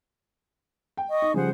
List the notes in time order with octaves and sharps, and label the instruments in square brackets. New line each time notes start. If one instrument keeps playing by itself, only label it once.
[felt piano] G5
[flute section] D#5 C#6 D#6
[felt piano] D#4
[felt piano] C#3 F3 G3 [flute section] G#4 C5 F#5